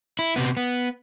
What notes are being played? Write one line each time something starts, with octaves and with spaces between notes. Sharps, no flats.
E4
C3 B3
B3